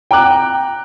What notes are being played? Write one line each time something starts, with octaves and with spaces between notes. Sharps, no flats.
G5 A#5 D6 F#6